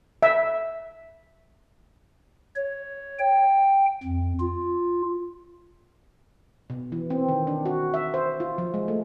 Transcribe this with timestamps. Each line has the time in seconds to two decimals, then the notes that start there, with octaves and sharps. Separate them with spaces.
0.23 E5
2.56 C#5
3.19 G5
4.03 F2
4.40 F4
6.70 B2
6.92 E3
7.10 C4
7.28 D#3
7.47 D4
7.66 F#4
7.94 E5
8.14 C5
8.40 F4
8.58 F3
8.74 G#3
8.88 A3